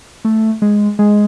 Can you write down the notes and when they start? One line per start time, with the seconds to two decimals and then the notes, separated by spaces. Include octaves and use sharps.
0.25 A3
0.62 G#3
0.99 G#3